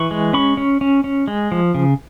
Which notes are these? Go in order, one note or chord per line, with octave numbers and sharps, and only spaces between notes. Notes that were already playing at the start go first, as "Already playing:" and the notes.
Already playing: E3 B5 C#6
G#3
C#4 B5 C#6
C#4
C#4
C#4
G#3
F3
C#3